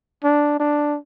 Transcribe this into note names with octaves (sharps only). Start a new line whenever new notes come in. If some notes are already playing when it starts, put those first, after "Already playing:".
D4
D4